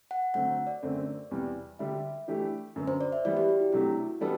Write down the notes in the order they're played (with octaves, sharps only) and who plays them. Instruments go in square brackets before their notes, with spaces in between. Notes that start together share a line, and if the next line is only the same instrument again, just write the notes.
[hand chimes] F#5
[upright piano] D3 F#3 A3 C4 [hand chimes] F#5
[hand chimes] D5
[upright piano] F#2 D3 A3 C4
E2 C3 G3
[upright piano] D3 G3 D4 G4 [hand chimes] E5
[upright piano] E3 A3 D4 G4
F#2 D3 F#3 B3
[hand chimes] C5
D5
E5
[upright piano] E3 G3 B3 [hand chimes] D5
[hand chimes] G4
F#4
E4
[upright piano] C3 F#3 A3 D4 G4 [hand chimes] E4
[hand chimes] F#4
[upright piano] E3 G3 B3 D4 A4 [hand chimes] E4